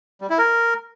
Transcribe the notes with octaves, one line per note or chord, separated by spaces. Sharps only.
G3
E4
A#4